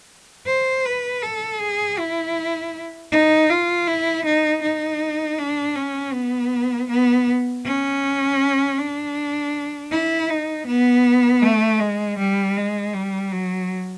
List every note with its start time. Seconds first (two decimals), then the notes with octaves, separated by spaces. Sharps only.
0.47 C5
0.86 B4
1.22 A4
1.60 G#4
1.99 E4
3.12 D#4
3.50 F4
3.87 E4
4.25 D#4
4.63 D#4
5.39 D4
5.76 C#4
6.13 B3
6.90 B3
7.65 C#4
8.79 D4
9.92 E4
10.30 D#4
10.67 B3
11.42 A3
11.80 G#3
12.18 G3
12.57 G#3
12.94 G3
13.32 F#3